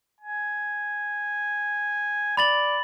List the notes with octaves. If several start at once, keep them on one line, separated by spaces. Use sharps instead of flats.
G#5
D5 B5 A6 F#7